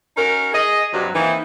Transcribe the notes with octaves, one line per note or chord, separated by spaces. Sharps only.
C#4 D#4 F#4 A#4
G#4 D#5
G2 C3 F#3
D#3 E3 A#3 C4 D#4 E4